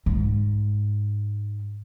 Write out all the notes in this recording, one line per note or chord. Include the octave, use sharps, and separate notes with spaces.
G#2